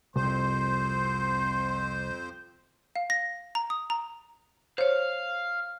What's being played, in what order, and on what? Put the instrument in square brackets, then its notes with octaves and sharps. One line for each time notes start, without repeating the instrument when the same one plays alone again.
[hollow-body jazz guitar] C2 [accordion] F2 C5 [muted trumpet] C6
[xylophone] F5
A#6
A#5
D#6
A#5
[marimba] C5 C#5 [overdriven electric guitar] F5